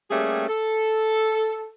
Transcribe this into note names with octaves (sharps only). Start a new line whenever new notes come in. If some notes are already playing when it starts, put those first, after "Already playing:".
G3 A3 A#3 C#4 G4 G#4
A4